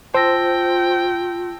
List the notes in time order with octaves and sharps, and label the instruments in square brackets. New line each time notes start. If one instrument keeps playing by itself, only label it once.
[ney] F4 [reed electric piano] C5 [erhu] G5 [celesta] A5 E6 A#6